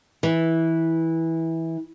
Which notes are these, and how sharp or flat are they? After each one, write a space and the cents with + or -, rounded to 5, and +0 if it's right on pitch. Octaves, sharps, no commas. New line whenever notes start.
E3 -15